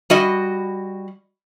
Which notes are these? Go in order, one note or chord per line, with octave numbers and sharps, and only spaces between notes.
G3 F#4 D#5